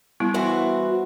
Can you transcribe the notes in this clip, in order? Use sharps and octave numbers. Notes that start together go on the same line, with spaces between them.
G3 B3 E4
E3 F#4 C5